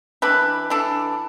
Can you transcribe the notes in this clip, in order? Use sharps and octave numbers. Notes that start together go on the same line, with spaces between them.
E3 D4 B4
E3 D4 A4